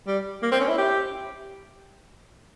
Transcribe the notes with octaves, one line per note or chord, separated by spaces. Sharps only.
G3
A#3
C4
C#4
E4
G4